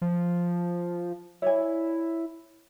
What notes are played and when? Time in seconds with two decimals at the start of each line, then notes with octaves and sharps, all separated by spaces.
0.02 F3
1.42 E4 C#5 D5 G#5